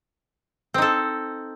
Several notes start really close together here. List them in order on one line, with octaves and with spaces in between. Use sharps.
C4 D#4 A4